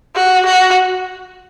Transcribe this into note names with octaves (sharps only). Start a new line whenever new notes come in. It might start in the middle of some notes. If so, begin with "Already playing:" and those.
F#4
F#4